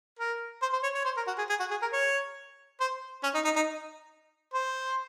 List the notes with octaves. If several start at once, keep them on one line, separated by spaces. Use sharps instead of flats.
A#4
C5
C5
C#5
C#5
C5
A#4
F#4
G#4
G#4
F#4
G#4
A#4
C#5
C5
C#4
D#4
D#4
D#4
C5